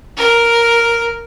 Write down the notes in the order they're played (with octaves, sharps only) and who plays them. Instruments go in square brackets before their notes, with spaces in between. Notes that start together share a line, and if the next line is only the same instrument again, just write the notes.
[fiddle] A#4